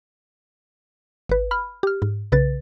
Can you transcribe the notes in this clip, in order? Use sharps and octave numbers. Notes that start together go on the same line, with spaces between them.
G#1 B4
B5 F6
G4 F6
G#2
B1 C#3 B4 A6